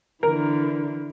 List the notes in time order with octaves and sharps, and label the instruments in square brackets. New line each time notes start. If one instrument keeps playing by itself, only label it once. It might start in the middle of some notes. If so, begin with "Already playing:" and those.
[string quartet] D3 E3 [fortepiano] A#4